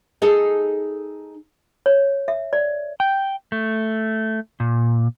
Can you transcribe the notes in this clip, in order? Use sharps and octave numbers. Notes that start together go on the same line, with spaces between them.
D#4 G#4 A4
C#5
E5
D5
G5
A3
A#2